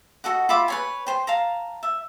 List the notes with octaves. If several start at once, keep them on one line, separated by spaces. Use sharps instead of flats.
F#4 A4 D#5 F#5
F4 E5 B5 D6
B4 C#5 G#5
C5 G5
F5 A5 A#5
E5